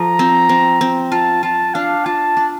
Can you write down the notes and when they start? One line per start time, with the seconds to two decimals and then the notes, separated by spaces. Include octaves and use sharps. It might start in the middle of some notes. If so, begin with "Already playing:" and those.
Already playing: F3 A4 A#5
0.19 C4
0.49 C4
0.81 C4
1.12 F4 A5
1.43 F4 A5
1.74 D4 F5
2.06 F4 A5
2.37 D4